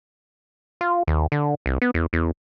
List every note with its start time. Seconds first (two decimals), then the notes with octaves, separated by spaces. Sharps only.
0.81 F4
1.07 D#2
1.32 D3
1.66 C2
1.82 B3
1.94 E2
2.13 E2